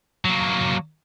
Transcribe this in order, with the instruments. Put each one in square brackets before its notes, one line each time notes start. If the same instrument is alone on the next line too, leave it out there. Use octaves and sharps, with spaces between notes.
[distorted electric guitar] F#3 A#3